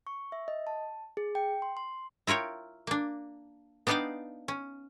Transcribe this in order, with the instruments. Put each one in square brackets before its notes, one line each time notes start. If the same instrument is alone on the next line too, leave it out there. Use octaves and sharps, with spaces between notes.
[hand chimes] C#6
E5
D#5
A5
G#4
G5
C6
C6
[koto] E4 F4 A#4 C#5 G5
A#3 D4
B3 D4 D#4 D5 F5 G5
C#4